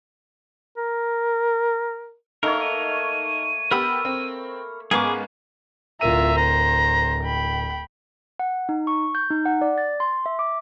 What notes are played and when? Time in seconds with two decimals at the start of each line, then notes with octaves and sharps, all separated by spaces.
0.77 A#4
2.43 A3 A#3 D#4 A#4 C#5
2.61 D#7
3.71 B3 G4 A#4 B5 E6
4.05 C4
4.91 G#2 A#3 B3 C#4 G#4 D6
6.01 D1 F4 A#4 E5 A#5 D#7
6.38 C5 A#5
7.23 G5 B5
8.39 F#5
8.69 D#4
8.87 C#6
9.15 G6
9.31 D#4
9.45 F#5
9.61 D5
9.78 A6
10.00 C6
10.26 E5
10.39 D6